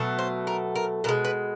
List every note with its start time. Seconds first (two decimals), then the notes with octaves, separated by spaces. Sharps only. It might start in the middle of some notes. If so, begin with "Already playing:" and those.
Already playing: B2 F#3 A3
0.19 C5
0.47 A#4
0.75 A#4
1.04 B2 A#4
1.09 G#3
1.25 B4